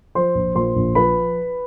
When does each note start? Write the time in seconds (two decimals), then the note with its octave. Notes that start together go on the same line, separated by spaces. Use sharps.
0.15 F3 C5 C6
0.35 A#1
0.55 A#2 C5 C6
0.76 A#1
0.95 F3 B4 B5